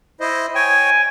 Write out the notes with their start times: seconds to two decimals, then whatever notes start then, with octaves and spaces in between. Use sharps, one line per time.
0.20 E4 C5 D#5
0.55 C#5 G5 G#5